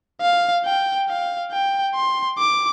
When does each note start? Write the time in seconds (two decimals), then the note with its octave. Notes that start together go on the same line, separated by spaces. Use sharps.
0.22 F5
0.65 G5
1.09 F5
1.52 G5
1.95 C6
2.38 D6